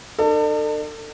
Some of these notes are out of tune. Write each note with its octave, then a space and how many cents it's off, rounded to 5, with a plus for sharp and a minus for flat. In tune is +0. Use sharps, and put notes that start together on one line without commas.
D4 +45 A4 +35